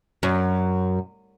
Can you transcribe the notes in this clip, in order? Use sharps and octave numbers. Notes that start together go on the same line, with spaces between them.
F#2